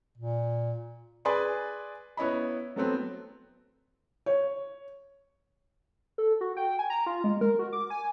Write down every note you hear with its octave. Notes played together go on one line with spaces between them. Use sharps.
A#2
G#4 B4 D5 G#5 B5 C6
B3 E4 C#5 D#5 B5
F#3 A3 B3 C4
C#5
A4
F#4
G5
G#5
A#5
F4
G#3
A#4
F#4
D6
G#5